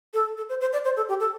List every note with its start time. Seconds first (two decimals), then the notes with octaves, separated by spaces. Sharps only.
0.14 A4
0.37 A4
0.49 C5
0.61 C5
0.73 D5
0.84 C5
0.97 A4
1.09 G4
1.20 A4